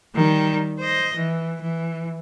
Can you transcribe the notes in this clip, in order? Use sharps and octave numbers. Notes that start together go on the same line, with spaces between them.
D#3 G3
C5 D#5
E3
E3